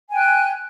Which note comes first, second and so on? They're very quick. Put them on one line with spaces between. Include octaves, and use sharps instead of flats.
G#5 G5 F#6